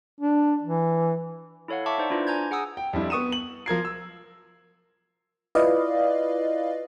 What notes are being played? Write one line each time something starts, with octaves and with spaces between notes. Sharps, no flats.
D4
E3
E4 A4 C#5 F5 F#5
E5 A5 C#6 D6
D#4 C5 D5
D4 E4 F4 B4
G#5 A#5 G6 G#6
G#4 F#5 G#5 A#5 D#6 E6
G5
F2 G3 D4 E4
B3 C#6 D#6 D#7 E7
F#7
F3 A#4 G#6 C7
E6
E4 F4 B4 D5 D#5 F5